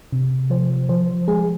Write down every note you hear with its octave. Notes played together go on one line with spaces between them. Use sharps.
C3
F3 C5
F3 C5
G#3 G#4